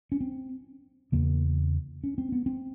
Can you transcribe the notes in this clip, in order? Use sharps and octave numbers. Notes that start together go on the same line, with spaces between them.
C#4
C4
E2 C#3 A#3
C#4
C4
B3
C4